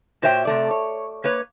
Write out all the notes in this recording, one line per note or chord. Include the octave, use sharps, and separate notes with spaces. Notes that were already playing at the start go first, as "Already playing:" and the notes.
A#2 F#4 C5 C#5 E5 G5
C3 A3 D5
C#5
A#3 B4 C#5